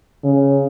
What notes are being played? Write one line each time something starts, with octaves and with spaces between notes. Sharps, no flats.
C#3